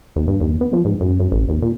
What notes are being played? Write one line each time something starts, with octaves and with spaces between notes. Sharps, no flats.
D#2
G2
D#2
B3
F3
G#2
F#2
F#2
A1
D#2
A#2